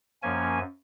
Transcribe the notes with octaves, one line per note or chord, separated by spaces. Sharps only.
F#2 F3 A#3 C#4 G#5